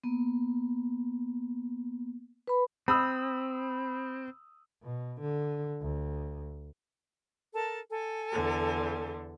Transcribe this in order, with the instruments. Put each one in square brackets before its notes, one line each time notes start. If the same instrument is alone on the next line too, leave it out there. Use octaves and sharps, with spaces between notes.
[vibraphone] A#3 B3
B4 B5
[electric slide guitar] C4 [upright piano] B5 D#6 E6
[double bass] B2
D3
D2
[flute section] A4 A#4 A5
A4 G#5
[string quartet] E2 D3